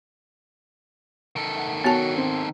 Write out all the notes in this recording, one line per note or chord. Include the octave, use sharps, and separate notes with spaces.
D#3 A4
F#5
B3 F#4 C#5 A5
C4